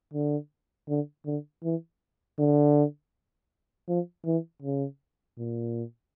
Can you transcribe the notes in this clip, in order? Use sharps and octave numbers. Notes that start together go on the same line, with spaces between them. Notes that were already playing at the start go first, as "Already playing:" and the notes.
D3
D3
D3
E3
D3
F3
E3
C#3
A#2